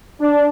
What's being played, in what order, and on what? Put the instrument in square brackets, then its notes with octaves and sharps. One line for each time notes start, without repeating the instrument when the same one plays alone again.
[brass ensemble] D4